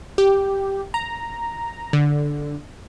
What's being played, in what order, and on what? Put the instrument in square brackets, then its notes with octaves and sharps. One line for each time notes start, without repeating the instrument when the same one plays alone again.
[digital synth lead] G4
A#5
D3